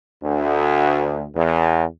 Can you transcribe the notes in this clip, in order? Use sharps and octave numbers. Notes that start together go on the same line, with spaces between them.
D2
E2